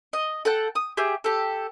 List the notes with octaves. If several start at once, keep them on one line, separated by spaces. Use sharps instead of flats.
D#5
A4 F#5 G5
D#6
G4 G#4 E5
G4 A4